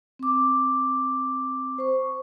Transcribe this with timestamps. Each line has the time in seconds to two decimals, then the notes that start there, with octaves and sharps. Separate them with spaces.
0.19 C4 D6
1.78 C5 C#6